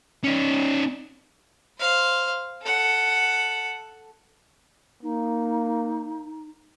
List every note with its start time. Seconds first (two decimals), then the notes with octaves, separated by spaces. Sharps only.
0.24 C#4 D#4
1.78 C5 F5
2.62 A4 F#5
5.03 A#3 D#4